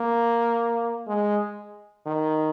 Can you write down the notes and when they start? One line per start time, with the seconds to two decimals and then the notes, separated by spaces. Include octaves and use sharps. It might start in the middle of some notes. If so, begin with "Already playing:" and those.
Already playing: A#3
1.07 G#3
2.06 D#3